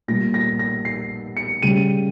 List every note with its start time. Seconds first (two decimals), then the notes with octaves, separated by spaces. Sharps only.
0.08 A#2 G3 A#6
0.34 A#6
0.59 A#6
0.85 C7
1.37 C#7
1.62 C#3 G3 D#7